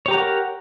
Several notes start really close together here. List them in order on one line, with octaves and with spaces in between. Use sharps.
C#5 G4 A#5 F#5 A#4